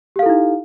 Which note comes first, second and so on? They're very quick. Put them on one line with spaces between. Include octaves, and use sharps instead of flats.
G4 F5 A4 E4 D#4